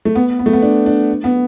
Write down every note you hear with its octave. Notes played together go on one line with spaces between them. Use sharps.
A3
B3
B3
A3
B3
D4
D4
B3